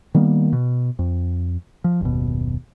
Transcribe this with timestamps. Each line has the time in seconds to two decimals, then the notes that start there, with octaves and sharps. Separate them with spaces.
0.14 D#3 G3 A#3 B3
0.53 B2
0.99 F2
1.84 F3
2.01 F#1 D#2 B2